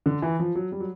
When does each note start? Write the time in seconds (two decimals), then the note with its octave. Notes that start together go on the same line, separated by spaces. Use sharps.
0.06 D3
0.22 E3
0.39 F3
0.55 F#3
0.72 G3
0.80 F#3